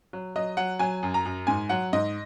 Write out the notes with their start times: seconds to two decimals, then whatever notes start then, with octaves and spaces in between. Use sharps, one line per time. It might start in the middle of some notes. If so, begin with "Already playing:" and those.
0.13 F#3
0.36 F#3 D#5
0.57 F#3 F#5
0.79 F#3 G#5
1.03 F#2
1.14 A#5
1.25 F#2
1.47 G#2 G#5
1.69 F#3 F#5
1.93 G#2 D#5